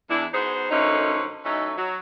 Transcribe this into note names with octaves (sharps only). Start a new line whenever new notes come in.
E2 D4 E4
B3 D#4 F#4 G#4 C5
F#2 D3 F3 A3 C#4 D#4
E3 F#3 A3 C#4 D#4
F#3